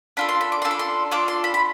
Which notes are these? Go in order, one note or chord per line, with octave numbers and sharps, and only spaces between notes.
D4 F4 A4 B5
C6
B5
D6
D4 F4 A4 C6
B5
C6
D4 F4 A4 D6
C6
B5
B5